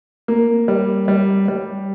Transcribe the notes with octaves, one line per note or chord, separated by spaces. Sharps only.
A#3
G3
G3
G3